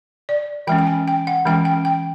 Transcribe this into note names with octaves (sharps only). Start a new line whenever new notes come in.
D5
E3 G#3 C#4 G5
G5
G#5
G5
F#5
E3 G#3 C#4 G5
G5
G5